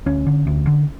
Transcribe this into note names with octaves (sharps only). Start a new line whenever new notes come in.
D2 C#4
D3
D2
D3